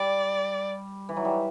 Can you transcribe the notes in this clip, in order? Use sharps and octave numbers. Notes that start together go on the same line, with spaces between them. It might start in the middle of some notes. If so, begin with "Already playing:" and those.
Already playing: G3 D5
E3
F#3
G3